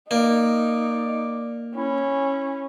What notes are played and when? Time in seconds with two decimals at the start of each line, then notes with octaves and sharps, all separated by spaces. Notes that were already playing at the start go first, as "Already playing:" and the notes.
0.11 A#3 D#4 D5
1.75 C#4 E4